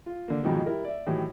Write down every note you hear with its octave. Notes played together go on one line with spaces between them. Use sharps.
F4
D3 A#3
F2 G#2 B2 D#3 F3 F#3
G3 E4 A#4
D5 E5
A2 D#3 E3 F#3 G3